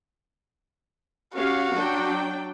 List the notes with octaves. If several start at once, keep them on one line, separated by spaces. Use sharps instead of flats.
C#4 F#4 G4 F5
F#3 D4 G5